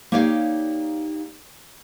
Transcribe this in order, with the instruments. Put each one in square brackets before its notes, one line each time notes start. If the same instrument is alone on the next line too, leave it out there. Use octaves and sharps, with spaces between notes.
[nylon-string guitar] A#3 D#4 G4 C#5 D5 F5